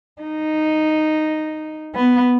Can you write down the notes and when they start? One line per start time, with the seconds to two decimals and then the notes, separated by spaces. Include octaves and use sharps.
0.22 D#4
1.95 B3